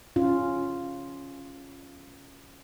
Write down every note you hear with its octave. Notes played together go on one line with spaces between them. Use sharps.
C#4 F4